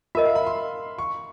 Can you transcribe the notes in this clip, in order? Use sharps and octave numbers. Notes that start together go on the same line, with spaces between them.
F4 A#4 D#5 E5
F5
B5
C6
C#6